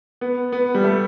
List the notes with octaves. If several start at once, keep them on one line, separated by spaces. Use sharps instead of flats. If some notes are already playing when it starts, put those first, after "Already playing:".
B3
B3
G3
A3